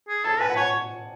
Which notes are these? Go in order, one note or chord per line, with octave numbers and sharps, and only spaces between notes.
G#4
A4 A5
B4 G#5
F#5
C#5 G#5